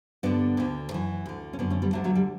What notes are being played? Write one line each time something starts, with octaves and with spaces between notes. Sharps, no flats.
G2 D3 B3 D4
D2 D3
F#2 E3
D2 D3
C#4
F#2 D3 B3 D4
A3 C#4
G3 B3
D2 D3 F#3 A3
F#3 A3
G3